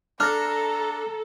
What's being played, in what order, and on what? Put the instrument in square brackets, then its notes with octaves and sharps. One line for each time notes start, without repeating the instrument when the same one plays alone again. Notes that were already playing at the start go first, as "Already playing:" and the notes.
[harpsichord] D4 [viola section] A4 [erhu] A#5 [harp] F6 A#6